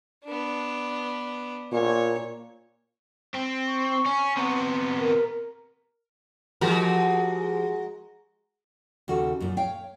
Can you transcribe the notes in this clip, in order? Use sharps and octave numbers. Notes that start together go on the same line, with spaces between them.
B3 D4
A#2 C#5
C4
C#6
C#4
C3 B3
A#4
F3 G#3 F#4 G4 A#4
D#2 C#3 F#4 G4 A4
F#2 A#2
C#5 F5 G5